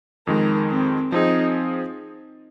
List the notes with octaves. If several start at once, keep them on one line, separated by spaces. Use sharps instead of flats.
F2 D#3 G#3 A#4
C4
F3 C4 D#4 G#4